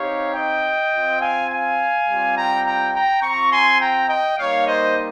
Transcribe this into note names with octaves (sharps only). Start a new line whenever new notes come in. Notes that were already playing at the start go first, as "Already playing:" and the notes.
Already playing: C4 D#4 G4 C#5 F5
D#5 G5
C4 F4
F5 G#5
F5 G#5
G3 C4 F4
G5 A#5
G5 A#5
G5 A#5
C4 F4 A#5 C#6
G#5 C6
G5 A#5
D#5 G5
G3 A#3 D#4 C#5 F5
C5 D#5